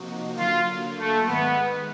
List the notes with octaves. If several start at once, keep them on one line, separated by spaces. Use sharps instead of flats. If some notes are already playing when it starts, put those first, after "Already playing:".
Already playing: C3 F3 A#3 D#4 F#4
D3 F#3 A#3 F4
A3
G#2 D#3 G#3 B3